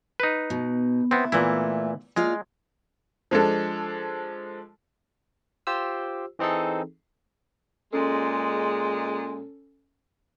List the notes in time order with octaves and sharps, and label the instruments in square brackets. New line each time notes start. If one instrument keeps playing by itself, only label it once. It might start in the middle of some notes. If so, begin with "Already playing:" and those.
[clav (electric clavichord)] D#4 B4
[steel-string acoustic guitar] B2
[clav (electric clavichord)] B3 C4 [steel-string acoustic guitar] E4
[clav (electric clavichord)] A#2 E3 E4 [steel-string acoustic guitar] A3 B3
[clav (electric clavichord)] G#3 [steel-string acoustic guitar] A#3 F4 D5
[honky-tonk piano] F3 G#3 D4 A4
[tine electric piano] F4 G4 C5 E6
E3 C4 D#4 G#4 A4
[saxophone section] A#2 G#3 [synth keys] C#4 A4